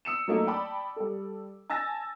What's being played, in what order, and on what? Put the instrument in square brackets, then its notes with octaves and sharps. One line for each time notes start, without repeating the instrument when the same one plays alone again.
[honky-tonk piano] D#6 E6 C#7 E7
F#3 A3 A#3 D#4
D5 G5 A5 B5 D6
G3 A4
G#5 A5 E6 A6 A#6